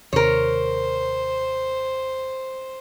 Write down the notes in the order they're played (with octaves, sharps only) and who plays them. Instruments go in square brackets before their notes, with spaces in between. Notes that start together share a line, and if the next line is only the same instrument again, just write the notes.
[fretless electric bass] D#2 C3 [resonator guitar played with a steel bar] A#4 C#5 [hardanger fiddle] C5